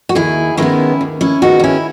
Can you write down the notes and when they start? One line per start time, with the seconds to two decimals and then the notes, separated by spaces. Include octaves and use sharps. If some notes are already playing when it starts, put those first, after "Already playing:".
0.09 F#4
0.15 D#2 E4 G#4
0.57 D#3 G#3 B3 C#4 E4
1.01 D#2
1.21 C#4 E4
1.42 D#3 G#3 B3 D#4 F#4
1.60 D#4
1.64 C#4 E4